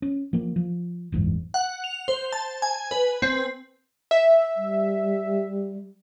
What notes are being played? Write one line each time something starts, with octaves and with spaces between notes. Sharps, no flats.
C#4
F3 A#3
F3
F#1 E2 G#2
F#5
F7
C5
A5
G#5
B4
C4
E5
G3